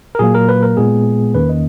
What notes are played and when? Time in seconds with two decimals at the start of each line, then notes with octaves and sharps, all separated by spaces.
0.15 A#4
0.19 A#2 F#3 A#3 G#4
0.35 A#4
0.49 B4
0.63 A#4
0.77 A#2 G#3 B3 G#4
1.34 E2 D#3 A#3 C#4 B4
1.49 D#5